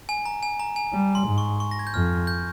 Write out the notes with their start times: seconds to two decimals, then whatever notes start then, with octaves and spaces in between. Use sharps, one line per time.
0.09 G#5
0.26 A#5
0.43 G#5
0.60 A#5
0.76 G#5
0.93 G3
1.15 C6
1.27 G#2
1.38 C#6
1.60 C#6
1.71 A#6
1.79 G#6
1.87 G6
1.94 F2 F6
2.27 G6